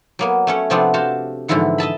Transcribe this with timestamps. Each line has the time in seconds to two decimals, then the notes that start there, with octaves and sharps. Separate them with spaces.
0.19 F#3 A#3 B3
0.47 A3 C#4 C#5
0.70 C3 F3 A3 B3 C4 D4
0.94 F#4 C5 F5 A5
1.48 G#2 D3 E3 F3 E4 F#5
1.78 D#5 E5 A5 B5